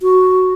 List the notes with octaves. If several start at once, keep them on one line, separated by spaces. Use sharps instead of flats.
F#4